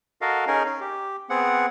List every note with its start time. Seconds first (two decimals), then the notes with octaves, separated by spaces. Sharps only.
0.21 F#4 A4 A#4 D#5 F5
0.47 C#4 D#4 G#4 A#4
0.66 C#4
0.81 G4
1.30 B3 C4 G#4 F#5